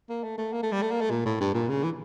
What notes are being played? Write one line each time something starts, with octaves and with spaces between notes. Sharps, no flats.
A#3
A3
A3
A#3
A3
G3
A3
A#3
A3
A#2
A2
G2
A#2
C#3
E3